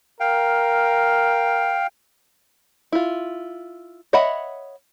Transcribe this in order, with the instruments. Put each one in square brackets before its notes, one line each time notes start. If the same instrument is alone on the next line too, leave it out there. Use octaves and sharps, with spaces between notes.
[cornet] A#4 [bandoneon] F5 G5
[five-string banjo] E4 F4
C#5 D#5 E5 F#5 B5